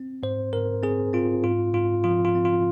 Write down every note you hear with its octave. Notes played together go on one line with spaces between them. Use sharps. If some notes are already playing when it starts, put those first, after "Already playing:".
Already playing: C4
G#2 C5
G#2 A#4
C4 G#4
C4 F4
G#2 F4
G#2 F4
F3 F4
F4
C4
F4